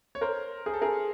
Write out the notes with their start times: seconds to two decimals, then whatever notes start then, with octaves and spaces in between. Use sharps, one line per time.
0.15 C#5
0.21 A#4 C5
0.66 G#4
0.74 A4
0.81 G#4 A#4